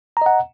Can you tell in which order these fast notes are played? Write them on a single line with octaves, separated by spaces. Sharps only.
A#5 D#5 F#5